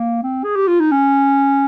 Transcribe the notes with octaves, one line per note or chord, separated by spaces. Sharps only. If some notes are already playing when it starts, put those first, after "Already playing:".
Already playing: A#3
C4
G#4
G4
F4
D#4
C#4